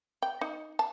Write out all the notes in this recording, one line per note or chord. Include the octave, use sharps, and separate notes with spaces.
G5
D#4
A5